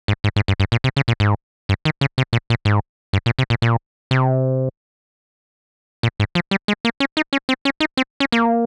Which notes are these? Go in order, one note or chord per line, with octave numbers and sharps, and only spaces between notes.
G#2
G#2
G#2
G2
G2
A#2
C3
C#3
A#2
G#2
G2
D#3
C#3
C3
A#2
A#2
G#2
G2
A#2
C3
A#2
A#2
C3
A#2
G#2
F3
G3
G#3
A#3
C#4
D#4
C#4
C4
C#4
D#4
C4
C#4
A#3